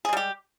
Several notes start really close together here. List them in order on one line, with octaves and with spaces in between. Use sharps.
G#4 G#3 G3 G4